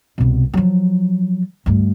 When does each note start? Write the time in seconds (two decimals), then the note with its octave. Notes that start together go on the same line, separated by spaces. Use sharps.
0.18 C2 B2
0.54 F3 F#3
1.66 D2 G2